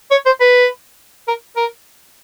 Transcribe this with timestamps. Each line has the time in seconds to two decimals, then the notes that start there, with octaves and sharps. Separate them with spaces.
0.11 C#5
0.26 C5
0.41 B4
1.28 A#4
1.56 A#4